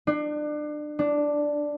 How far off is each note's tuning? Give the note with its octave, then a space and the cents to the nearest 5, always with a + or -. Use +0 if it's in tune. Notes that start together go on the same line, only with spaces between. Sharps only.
D4 +30
D4 +0